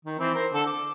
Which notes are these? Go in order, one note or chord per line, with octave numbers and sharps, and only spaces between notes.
D#3
E3 C4
A#4 C5
D3 A4
D6